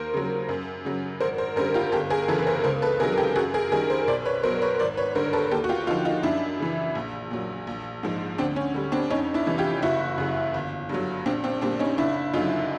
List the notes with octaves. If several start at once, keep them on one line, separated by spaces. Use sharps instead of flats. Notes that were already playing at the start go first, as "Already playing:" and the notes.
Already playing: D#2 A#4 C5
C#3 F#3
F#2
C#3 F#3
G#1 A#4 C5
A#4 C5
F#2 D3 G3 A#4 C5
F4 G4
G1 G4 A4
G#4 A#4
F#2 C#3 E3 A4 B4
B4
A#4 C5
C#2 A#4 C5
A4 B4
C3 D#3 F#3 G#4 A#4
G4 A4
F#2 F#4 G#4
G#4 A#4
D#3 G3 G#4 A#4
A#4 C5
B1 C5 D5
B4 C#5
B2 F#3 A#4 C5
B4 C#5
G#1 C5 D5
B4 C#5
G2 D3 G3 A#4 C5
A4 B4
D#2 G4 A4
F#4
F4 G4
D3 F3 D#4 F4
D#4 F4
F#2 D4 E4
C#3 E3
A#1
A#2 F#3
A#1
G#2 F3 G#3
D2 C4 D4
C#4
D3 G3
C4 D4
F2 C#4 D#4
D4 E4
C3 E3 G3
F4 G4
F#1 E4 F#4
F#2 C#3
G1
G2 D3 F#3
A#1 C4 D4
C4 D4
A#2 G3 C4 D4
C#4 D#4
F#1 D4 E4
F#2 D3 F#3 D#4 F4